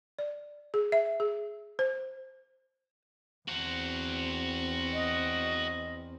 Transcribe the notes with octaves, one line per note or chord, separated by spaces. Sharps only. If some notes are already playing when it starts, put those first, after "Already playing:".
D5
G#4
E5
G#4
C5
E2 C4 F#4 C5
D#5